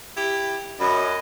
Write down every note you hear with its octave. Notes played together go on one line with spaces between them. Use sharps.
E4 G4
F#2 D#5 B5